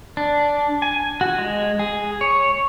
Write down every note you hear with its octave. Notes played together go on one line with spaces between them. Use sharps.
D4
G#5
F#4
G#3
G#4
C#5